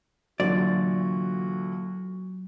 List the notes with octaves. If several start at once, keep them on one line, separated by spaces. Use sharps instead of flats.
A#2 D3 E3 F#3 F#4 D5